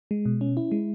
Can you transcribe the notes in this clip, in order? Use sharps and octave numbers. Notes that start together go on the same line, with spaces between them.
G#3
B2
C#4
E4
G#3